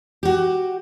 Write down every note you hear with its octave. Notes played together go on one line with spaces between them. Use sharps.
F#4 G4